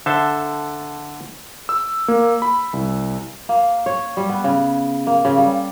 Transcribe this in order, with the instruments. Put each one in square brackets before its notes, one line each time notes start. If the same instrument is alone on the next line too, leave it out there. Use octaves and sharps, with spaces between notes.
[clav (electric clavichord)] D3 A4 C5 E5 A5
[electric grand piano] E6
A#3
B5
C2
[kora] A#3
C#5
G3
B3
C#3
A#3
C#3
G3